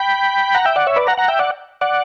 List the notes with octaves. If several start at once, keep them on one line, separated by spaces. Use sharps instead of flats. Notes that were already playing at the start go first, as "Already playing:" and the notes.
Already playing: G5 B5
F#5 A#5
E5 G5
D5 F#5
C#5 E5
B4 D5
F#5 A#5
F#5 A#5
E5 G5
D5 F#5
D5 F#5